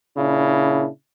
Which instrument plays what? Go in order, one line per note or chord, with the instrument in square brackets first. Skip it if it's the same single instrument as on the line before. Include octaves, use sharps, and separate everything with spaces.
[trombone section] A#2 C#3 D4 E4